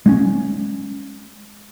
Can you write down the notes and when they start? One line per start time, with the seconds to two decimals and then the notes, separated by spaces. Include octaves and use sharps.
0.06 G#3 C4 C#4